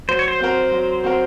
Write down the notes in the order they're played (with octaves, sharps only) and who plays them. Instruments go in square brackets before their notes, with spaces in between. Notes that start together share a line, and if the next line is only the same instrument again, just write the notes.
[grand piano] F#3 [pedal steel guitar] C5
[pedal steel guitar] C#5
C5
[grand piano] C4 F#4 A#4
F#3
C4 F#4 A#4